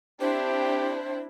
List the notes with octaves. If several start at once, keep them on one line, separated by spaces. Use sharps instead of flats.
C4 D4 E4 G4 C5